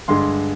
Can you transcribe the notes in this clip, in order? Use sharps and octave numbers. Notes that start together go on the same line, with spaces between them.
G2 D3 G#3 C6